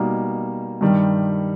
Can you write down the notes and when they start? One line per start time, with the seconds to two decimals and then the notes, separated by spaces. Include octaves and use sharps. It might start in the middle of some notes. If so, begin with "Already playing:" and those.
Already playing: B2 G3 A#3 D#4
0.81 G2 D#3 G3